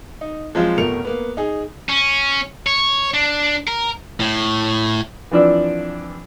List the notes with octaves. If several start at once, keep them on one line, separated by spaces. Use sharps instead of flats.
D#4
F3 F#3 G#3 C4 F4
F1 B2 A3 A#4 C#7 F7
A#3 B3
D#4 G#4
C#4
C#5
D4
A#4
A2
E3 F3 C4 D4 D5 E6